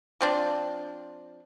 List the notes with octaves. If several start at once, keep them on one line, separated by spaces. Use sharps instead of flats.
F3 C4 D4